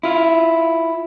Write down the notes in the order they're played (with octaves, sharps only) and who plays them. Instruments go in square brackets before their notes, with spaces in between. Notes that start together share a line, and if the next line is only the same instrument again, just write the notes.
[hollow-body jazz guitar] E4 F4